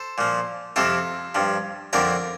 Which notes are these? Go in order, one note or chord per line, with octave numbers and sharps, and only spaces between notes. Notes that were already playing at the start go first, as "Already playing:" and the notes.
Already playing: A4 C5
A#2 F3
F2 C3 F3 F4 A4
G2 F3
F2 D3 F3 A#4 D5